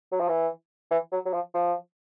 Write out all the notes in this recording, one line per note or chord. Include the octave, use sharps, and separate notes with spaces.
F#3
F3
E3
E3
F#3
F#3
F3
F3